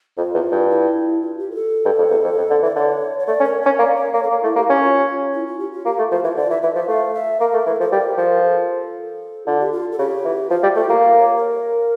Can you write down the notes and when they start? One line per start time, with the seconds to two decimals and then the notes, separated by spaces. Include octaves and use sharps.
0.17 F2 F4
0.35 E2
0.52 G2
0.70 E4
1.21 F4
1.39 G4
1.51 A#4
1.55 A4
1.85 G2
1.98 F2
2.11 E2
2.23 F2
2.38 F2
2.50 D3
2.62 E3 D5
2.76 D3 C#5
3.19 C#5
3.27 A3 D5
3.40 C#4
3.44 A#4
3.62 C#4 C#5
3.79 A#3 D5
3.96 C#5
4.14 A#3 C#5
4.23 A4
4.31 A#3 A#4
4.43 A3 E4
4.56 A#3 G4
4.69 C#4 G4
4.82 F4
5.34 E4
5.47 F4
5.59 G4
5.72 F4
5.85 A#3 G4
5.98 A3
6.11 F3 F4
6.24 E3 F4
6.37 D3 D5
6.50 E3 E5
6.63 E3 E5
6.75 F3 E5
6.88 A3 F5
7.14 E5
7.40 A#3 A#4
7.53 A3
7.66 E3 A4
7.80 F3 A4
7.92 G3 A#4
8.18 F3 A#4
8.43 A4
9.47 D3 F4
9.60 G4
9.72 F4
9.92 A4
9.98 C#3 G4
10.25 E3
10.50 F3 F4
10.63 G3
10.76 A3 F4
10.89 A#3 G4
11.02 A#4
11.18 C#5
11.37 A#4